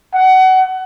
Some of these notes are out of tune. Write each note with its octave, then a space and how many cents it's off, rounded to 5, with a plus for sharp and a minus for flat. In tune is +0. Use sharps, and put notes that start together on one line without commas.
F#5 +25